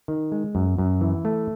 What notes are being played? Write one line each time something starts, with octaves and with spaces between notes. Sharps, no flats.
D#3
G#3
F#2
F#2
E3
A3